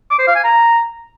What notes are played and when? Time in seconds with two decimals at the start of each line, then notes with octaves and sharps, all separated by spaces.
0.10 D6
0.19 C5
0.27 F5
0.36 G#5
0.44 A#5